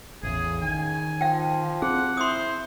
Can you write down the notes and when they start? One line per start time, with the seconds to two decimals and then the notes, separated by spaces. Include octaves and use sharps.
0.23 A1 E2 C#3 G#4
0.62 D#3 G#5
1.21 F3 F5 G5
1.82 C4 G#4 F#5
2.17 E4 C5 C6 D#6